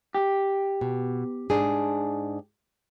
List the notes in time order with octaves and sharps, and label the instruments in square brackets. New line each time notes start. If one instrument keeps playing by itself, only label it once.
[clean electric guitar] G4
[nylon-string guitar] B2
G#2 D4 G#4